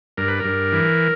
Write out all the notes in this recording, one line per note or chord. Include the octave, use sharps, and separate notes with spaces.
G2 A#4
B4
A#4
G2
E3